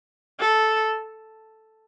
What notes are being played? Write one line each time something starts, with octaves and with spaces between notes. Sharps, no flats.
A4